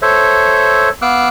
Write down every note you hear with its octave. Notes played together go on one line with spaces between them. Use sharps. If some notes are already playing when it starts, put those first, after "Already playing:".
A4 C5 C#5 E5
B3 F5 D6 E6 F#6